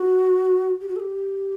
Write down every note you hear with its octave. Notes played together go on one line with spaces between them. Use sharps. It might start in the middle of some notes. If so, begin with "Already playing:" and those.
Already playing: F#4
G4
F#4
A4
G4